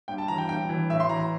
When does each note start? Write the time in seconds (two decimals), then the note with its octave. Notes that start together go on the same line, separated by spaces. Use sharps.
0.08 G2 G5
0.18 A5
0.28 E3 A#5
0.38 G5
0.49 G2 G5
0.69 E3
0.90 A2 E5
1.00 C6
1.09 E3 A#5
1.20 A#5